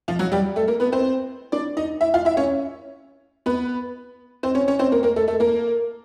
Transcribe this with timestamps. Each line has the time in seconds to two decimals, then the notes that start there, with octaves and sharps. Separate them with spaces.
0.08 F3 F4
0.19 F#3 F#4
0.32 G3 G4
0.56 A3 A4
0.68 A#3 A#4
0.80 B3 B4
0.92 C4 C5
1.52 D4 D5
1.77 D#4 D#5
2.01 E4 E5
2.14 F4 F5
2.25 E4 E5
2.37 C#4 C#5
3.46 B3 B4
4.43 C4 C5
4.55 C#4 C#5
4.68 C#4 C#5
4.79 C4 C5
4.92 A#3 A#4
5.03 A#3 A#4
5.16 A3 A4
5.28 A3 A4
5.40 A#3 A#4